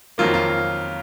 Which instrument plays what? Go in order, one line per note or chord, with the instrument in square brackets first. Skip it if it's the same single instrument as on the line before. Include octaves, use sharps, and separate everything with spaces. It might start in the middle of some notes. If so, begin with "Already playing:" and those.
[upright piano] F2 D#3 F#3 A#3 F4
F4